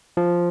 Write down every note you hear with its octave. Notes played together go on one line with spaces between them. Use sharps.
F3